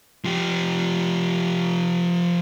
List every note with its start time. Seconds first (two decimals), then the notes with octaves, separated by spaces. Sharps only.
0.25 F3 G4